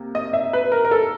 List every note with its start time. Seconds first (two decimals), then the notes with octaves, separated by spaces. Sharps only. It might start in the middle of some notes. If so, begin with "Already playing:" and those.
Already playing: C3 A#3
0.15 D#5
0.33 E5
0.53 B4
0.72 A#4
0.85 A#4
0.91 A4